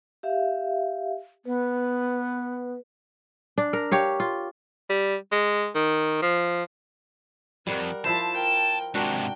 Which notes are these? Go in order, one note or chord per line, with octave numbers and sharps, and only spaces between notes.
G4 E5 F5
B3 B4
D4
A#4
G4 C#5 F5
F4
G3
G#3
D#3
F3
F2 G3 A#4 F#5
F3 E4 C5 A5
A#4 G5
G#2 C3 D4 F#4 A#4 G5